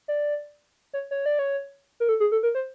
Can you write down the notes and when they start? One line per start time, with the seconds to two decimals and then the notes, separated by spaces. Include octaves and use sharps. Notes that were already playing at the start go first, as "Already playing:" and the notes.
0.08 D5
0.93 C#5
1.11 C#5
1.26 D5
1.39 C#5
2.00 A#4
2.09 A4
2.20 G#4
2.32 A4
2.43 A#4
2.55 C5